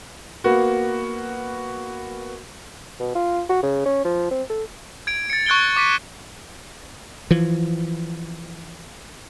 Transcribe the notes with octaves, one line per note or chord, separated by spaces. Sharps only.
A#3 B3 F#4
B2
F4
F#4
C#3
C#4
F3
C4
A4
G#6 D7
A6 C#7
C#6 F#6 G#6 D7 G7
F#6
D6 B6 D#7
E3 F3